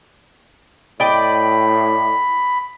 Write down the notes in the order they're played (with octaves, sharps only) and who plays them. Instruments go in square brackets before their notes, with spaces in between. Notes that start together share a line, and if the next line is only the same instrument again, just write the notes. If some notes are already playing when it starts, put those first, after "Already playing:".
[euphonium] A2 [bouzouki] D5 D#5 G5 [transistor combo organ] B5